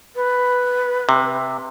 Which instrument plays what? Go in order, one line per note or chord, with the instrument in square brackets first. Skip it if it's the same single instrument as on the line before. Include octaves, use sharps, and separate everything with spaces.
[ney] B4
[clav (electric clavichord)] C3